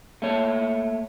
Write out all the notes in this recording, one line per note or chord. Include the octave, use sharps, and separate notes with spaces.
A3 A#3 C#5